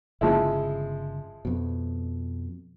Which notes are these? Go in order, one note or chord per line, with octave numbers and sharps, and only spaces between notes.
G1 C#3 F3 G#3 E4
F2 B2